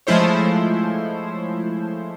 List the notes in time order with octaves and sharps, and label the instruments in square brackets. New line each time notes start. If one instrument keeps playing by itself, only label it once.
[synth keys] F3 G#3 A3 E4 C5 C#5